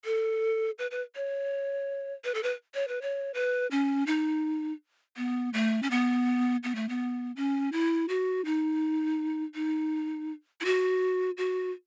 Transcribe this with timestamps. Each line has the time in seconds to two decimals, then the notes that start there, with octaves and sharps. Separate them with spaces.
0.05 A4
0.79 B4
0.91 B4
1.15 C#5
2.24 B4
2.35 A4
2.43 B4
2.74 C#5
2.88 B4
3.02 C#5
3.34 B4
3.71 C#4
4.07 D#4
5.17 B3
5.53 A3
5.83 C#4
5.91 B3
6.64 B3
6.75 A3
6.89 B3
7.36 C#4
7.73 E4
8.09 F#4
8.45 D#4
9.55 D#4
10.61 E4
10.65 F#4
11.38 F#4